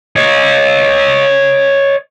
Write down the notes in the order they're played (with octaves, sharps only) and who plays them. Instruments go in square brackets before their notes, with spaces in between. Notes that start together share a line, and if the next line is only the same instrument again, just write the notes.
[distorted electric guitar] C#5 D#5